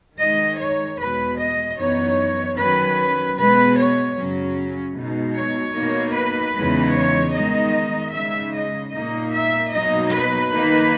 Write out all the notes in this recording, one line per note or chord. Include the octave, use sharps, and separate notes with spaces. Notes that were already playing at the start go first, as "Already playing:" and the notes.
D#3 G#3 D#4 D#5
C#5
E2 B2 G#3 B4
D#5
F#2 E3 B3 D#4 C#5
D#3 F#3 C#4 B4
B2 G#3 B3 B4
C#5
F#2 C#3 F#3 C#4
B2 G#3 D#4
C#5
B2 A#3 D#4
B4
E2 C#3 E3 G#3 D#4
C#5
D#3 G#3 B3 D#4 D#5
C#3 G#3 D#4 E5
D#5
A#2 A#3 D#4 D#5
E5
B2 F#3 A#3 D#4 D#5
B4
D#3 A#3 D#4